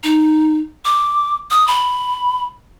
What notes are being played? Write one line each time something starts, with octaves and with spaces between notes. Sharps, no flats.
D#4
D6
D#6
B5